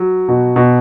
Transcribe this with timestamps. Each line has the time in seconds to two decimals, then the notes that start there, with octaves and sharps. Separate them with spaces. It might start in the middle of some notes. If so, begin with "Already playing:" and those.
Already playing: F#3
0.28 B2
0.56 B2